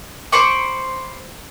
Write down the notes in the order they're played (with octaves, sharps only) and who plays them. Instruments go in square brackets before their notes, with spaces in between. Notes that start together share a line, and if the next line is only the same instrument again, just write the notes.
[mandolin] C5 B5 C#6 D6